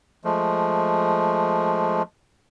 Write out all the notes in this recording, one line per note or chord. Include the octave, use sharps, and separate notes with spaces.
F3 G#3 A3